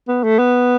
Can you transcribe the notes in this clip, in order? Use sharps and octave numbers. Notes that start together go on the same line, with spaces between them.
B3
A3
B3